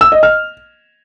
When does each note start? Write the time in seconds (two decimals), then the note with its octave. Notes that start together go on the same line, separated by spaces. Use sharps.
0.01 E6
0.12 D#5
0.23 F6